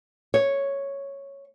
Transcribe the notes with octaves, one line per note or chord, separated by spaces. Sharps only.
C#5